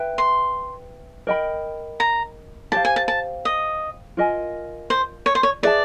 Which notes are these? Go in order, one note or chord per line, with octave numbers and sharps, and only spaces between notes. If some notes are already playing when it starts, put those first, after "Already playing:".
Already playing: B4 E5 G5
C6
A#4 D#5 G5 B5
A#5
G4 C5 F5 A5
G#5
A5
A5
D#5
F4 A#4 D#5 G#5
C5
C#5
C5
C#5
G#4 B4 D5 E5 A5